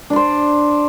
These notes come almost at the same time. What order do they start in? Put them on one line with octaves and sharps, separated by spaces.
D4 D5 C5